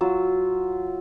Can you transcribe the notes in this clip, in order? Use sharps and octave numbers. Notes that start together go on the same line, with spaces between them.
F#3 F4 E6